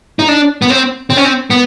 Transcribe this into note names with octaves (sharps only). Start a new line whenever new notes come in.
D#4
D4
B3
C4
C4
C#4
C4
B3